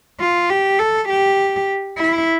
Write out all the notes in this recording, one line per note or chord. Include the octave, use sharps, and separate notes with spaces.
F4
G4
A4
G4
E4